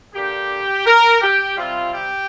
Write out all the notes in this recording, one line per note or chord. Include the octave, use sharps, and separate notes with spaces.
D3 A#3 D4 G4
A#4
G4
C3 G3 C4 F4
G4